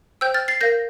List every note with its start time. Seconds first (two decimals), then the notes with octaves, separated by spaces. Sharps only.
0.21 C5 G5 E6 G6
0.34 F6 A6
0.48 A6 C7
0.61 A#4 F5 G6 A#6